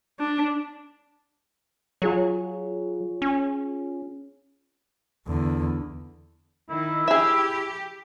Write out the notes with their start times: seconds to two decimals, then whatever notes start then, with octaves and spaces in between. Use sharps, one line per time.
0.20 D4
2.02 F#3 F4 G#4 C#5
3.22 C#4
5.27 E2 D3
6.70 D#3 E4
7.08 G4 G#4 E5